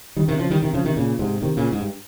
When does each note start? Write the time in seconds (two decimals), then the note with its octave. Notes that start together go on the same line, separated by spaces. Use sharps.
0.16 D#3 G3
0.28 C3 D#3
0.39 C#3 F3
0.51 D#3 G3
0.62 C3 D#3
0.74 C#3 F3
0.85 C3 D#3
0.96 A#2 C#3
1.19 G#2 C3
1.42 C3 D#3
1.57 A#2 C#3
1.72 G#2
1.80 G2